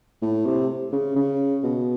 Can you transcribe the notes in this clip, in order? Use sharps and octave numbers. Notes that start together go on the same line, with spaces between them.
A2
C3
C#3
C#3
B2